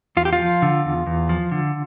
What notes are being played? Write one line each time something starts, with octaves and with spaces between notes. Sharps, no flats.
E2 F4
G4
F4
F3
D3
E2
E2
F3
D3